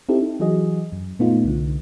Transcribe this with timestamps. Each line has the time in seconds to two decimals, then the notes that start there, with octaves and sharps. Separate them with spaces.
0.09 C4 D#4 E4 G4 A4
0.21 D#4
0.40 E3 F#3 F#4 G#4 D#5
0.92 F#2
1.19 A#2 A3 B3 D#4 F4
1.44 C2 D3